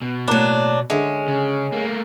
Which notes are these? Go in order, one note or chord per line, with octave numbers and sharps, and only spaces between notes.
B2
A2 F#3 A#3 D4 A#5
D3 G#3 C#4 E5
C#3
A3 A#3